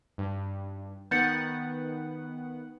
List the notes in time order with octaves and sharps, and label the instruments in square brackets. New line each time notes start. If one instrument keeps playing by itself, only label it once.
[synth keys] G2
[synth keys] D#3 B3 F#5 [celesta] G6 A6 C#7